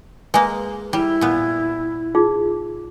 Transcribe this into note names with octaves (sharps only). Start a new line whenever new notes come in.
G#3 A#3 B4
G3 E4
A#2 B3
D#4 F4 G#4